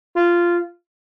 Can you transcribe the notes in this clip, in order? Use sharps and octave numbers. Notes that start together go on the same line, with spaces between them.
F4